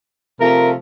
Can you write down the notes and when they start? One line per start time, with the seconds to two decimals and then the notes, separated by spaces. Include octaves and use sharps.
0.40 C3 F3 A3 A#4